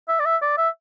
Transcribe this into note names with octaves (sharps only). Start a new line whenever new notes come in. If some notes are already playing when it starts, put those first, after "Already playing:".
E5
D5
E5
D5
E5